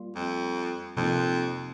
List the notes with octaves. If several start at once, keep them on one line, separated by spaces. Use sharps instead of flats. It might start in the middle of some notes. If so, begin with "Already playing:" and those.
Already playing: G3 A#3 F4
F2
F2 C3 F3 A#3 D#4